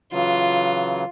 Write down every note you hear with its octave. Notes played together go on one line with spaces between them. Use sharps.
C#3 E3 F#3 F4